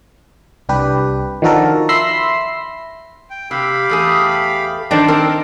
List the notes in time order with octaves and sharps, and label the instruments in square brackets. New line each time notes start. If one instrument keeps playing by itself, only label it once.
[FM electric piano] C2 D4 G4 B4
D#3 F3 D4 F#4 A4 A#4
E5 B5 C6 E6 A#6 C7
[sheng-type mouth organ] G5
[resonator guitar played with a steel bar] C3 [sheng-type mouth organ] G4 F5 B5
[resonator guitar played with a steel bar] E2 A3 G#4
[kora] D#3 D4 C5 [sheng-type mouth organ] A4 G5 D6 [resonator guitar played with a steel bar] D5
[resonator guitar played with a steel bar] C4 A#4